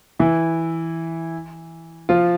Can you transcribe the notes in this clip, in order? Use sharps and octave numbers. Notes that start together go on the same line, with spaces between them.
E3 E4
F3 F4